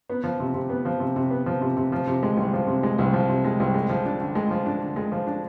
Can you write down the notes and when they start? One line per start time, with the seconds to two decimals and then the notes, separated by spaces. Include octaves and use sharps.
0.10 B3
0.24 F3
0.40 C3
0.54 C3
0.69 B3
0.85 F3
1.00 C3
1.16 C3
1.30 B3
1.46 F3
1.61 C3
1.77 C3
1.92 F3
2.07 C3
2.23 G#3
2.37 C2
2.53 F3
2.67 C3
2.83 G#3
2.98 C2
3.13 F3
3.29 C3
3.45 G#3
3.60 C2
3.74 G#3
3.89 F3
4.06 D4
4.21 D3
4.35 G#3
4.50 F3
4.66 D4
4.82 D3
4.96 G#3
5.12 F3
5.27 D4